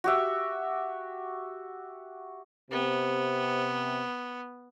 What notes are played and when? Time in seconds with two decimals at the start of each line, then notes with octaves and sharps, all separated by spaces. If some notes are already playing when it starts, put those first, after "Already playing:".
0.04 F#4 G4 E5
2.71 C3 B3